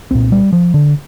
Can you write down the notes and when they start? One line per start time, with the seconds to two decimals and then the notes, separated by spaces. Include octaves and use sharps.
0.11 C2 A#2 C4
0.32 G3
0.53 F3
0.74 D3